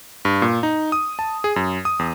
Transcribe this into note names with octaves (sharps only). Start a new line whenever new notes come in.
G2
A#2
D#4
D#6
A5
G#4
F#2
D#6
E2